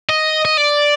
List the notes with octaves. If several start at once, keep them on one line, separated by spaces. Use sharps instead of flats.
D#5
D#5
D5